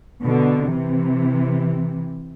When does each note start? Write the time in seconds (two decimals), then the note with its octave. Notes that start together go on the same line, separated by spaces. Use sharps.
0.25 B2 D3
0.71 C3 E3